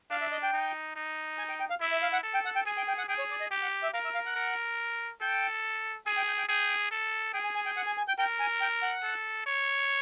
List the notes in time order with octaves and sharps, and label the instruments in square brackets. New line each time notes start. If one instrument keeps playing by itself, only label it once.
[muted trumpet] D4 [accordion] F5
[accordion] E5
D#5
G5
[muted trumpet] D#4
D#4
[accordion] G#5
G5
G5
F5
[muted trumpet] E4 [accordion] E5
[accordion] E5
F5
F#5
[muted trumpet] A4
[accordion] G5
F#5
G5
[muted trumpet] G#4 [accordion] G#5
[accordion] G5
G5
F#5
[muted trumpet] G#4 [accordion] G5
[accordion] C#5
D5
D#5
[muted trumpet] G4 [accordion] G5
[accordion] F#5
E5
[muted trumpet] A#4 [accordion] F5
[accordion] E5
F5
F#5
[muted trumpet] A#4
[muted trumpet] A4 [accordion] G5
[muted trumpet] G#4 [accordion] G#5
[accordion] G5
G5
G5
[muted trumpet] G#4 [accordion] G5
[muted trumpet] A4
[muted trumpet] G#4 [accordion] G5
[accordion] G#5
G#5
G5
F#5
G#5
G#5
G5
[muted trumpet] A#4 [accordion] G5
[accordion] G#5
G5
F#5
[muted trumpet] A4
C#5